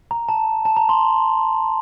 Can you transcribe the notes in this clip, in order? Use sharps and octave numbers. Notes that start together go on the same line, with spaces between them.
A#5
A5
A5
A#5
C6